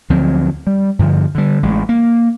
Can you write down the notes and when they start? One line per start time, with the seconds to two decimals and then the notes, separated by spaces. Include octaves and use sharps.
0.10 D2 F3 F#3 C4
0.67 G3
0.99 G2 D3 F3
1.35 D3 G3
1.63 A1 G#3
1.89 A#3